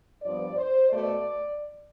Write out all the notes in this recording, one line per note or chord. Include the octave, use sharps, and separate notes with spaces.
G2 F3 B3 D5
C5
B2 A3 D5